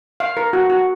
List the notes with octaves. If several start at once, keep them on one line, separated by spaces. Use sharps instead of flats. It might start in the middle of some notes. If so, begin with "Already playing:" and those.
F5
A#4
F#4
F#4